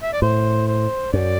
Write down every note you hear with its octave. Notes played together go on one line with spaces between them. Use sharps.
E5
D5
A2 C5
C5
F#2 D5